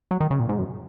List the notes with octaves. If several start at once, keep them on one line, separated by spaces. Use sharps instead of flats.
F#3
D#3
C#3
A#2
G#2
F#2